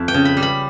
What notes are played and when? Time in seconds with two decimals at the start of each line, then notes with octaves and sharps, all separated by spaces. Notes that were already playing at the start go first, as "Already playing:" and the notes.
Already playing: F2 E5
0.08 G5
0.14 C#3
0.25 B5
0.37 G3
0.43 B5